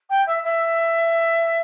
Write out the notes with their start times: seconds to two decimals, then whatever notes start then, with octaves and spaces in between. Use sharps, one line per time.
0.10 G5
0.27 E5
0.44 E5